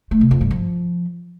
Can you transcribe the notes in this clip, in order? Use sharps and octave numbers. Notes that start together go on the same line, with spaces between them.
A3
C3
F2
G2
F3